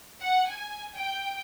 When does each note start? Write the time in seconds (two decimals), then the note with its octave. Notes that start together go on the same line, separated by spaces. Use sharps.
0.21 F#5
0.50 G#5
0.96 G5